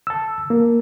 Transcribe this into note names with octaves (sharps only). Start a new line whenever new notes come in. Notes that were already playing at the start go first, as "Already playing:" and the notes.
A5 E6
A#3